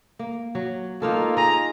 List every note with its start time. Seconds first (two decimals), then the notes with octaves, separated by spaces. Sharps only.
0.19 A#3
0.55 F#3
1.02 A#3 D#4 F4 A4
1.37 G#4 D#5 A#5